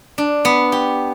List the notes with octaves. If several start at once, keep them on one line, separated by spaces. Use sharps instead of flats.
D4
B3
G4